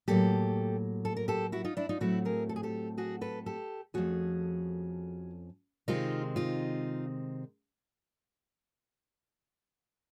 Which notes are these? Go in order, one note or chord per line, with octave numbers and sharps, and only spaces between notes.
A2 F#3 A#3 G4 A4
A4
A#4
G4 A4
E4 F#4
D#4 F4
D4 E4
D#4 F4
A2 F#3 A3 C4 E4 F#4
G#4 A#4
A4
G#4
G4 A4
F#4 G#4
A4 B4
G4 A4
F2 C3 F3 A3 C#4 F#4 G#4
C3 D#3 G#3 C4 D#4 F4
D#4 F4